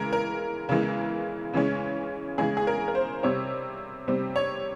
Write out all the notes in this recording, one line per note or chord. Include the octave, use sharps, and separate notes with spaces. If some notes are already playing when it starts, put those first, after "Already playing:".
Already playing: C#3 E3 G#3 A#4
A#4
C#3 E3 G#3
C#3 E3 G#3 C#4
C#3 E3 G#3 C#4 G#4
G#4
A#4
A#4
C5
C3 G3 C4 C#5
C3 G3 C4
C#5